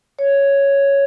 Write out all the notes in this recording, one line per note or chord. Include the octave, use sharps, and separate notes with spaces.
C#5